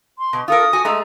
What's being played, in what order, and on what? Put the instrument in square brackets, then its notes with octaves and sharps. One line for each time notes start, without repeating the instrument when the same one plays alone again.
[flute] C6
[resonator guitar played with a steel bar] B2
[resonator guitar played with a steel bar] F4 A4 A#4 [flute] D#6
[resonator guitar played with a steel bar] F#4 G#5
[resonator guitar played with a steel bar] G#3 A3 G#4 [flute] A#5